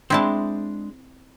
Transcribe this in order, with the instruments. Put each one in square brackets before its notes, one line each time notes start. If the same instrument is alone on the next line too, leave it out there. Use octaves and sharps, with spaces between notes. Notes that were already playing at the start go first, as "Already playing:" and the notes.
[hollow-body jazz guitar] G#3 D4 C5 [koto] C4 E4 A5